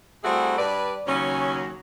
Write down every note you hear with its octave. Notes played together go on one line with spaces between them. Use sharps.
G3 A3 C4 E4 F#4 G#4
G2 B4 D5
D#2 C#3 F#3 C#4